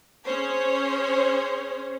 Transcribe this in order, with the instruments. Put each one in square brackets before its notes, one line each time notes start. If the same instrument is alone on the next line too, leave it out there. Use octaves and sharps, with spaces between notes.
[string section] C#4 G#4 C5 C#5